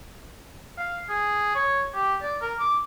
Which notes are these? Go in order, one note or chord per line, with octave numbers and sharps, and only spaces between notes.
F5
G#4
C#5
G4
D5
A#4
D6